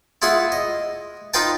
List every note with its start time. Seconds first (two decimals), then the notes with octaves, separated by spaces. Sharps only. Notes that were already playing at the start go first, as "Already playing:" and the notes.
0.22 E4 F4 G#4 E5 F#5
0.52 D#5
1.34 D#4 F4 B4 F5 G5 A5